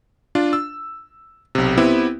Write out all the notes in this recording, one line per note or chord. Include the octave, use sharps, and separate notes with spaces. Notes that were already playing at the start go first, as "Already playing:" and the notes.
D4 F4
E6
B1 C3
B3 C4 E4 G4